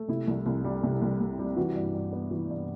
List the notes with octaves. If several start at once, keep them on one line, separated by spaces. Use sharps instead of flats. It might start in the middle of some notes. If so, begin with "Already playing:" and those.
Already playing: A3
C3 E4
C2
C2
G3
C3
C2
C2
G3
E3 F#4
G2
G2
B3
E3
G2